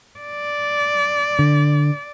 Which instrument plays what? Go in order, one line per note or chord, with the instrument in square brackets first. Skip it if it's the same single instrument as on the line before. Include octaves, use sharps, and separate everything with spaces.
[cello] D5
[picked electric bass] D3